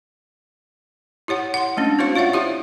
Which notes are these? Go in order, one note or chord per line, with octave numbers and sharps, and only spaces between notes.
E4 G4 C#5 F#5
F#5 C6
G#3 A3 C#4 D4
C4 E4 F#4 C5 C#5 F5
F4 C#5 D5 E5 F#5
E4 G4 C5 E5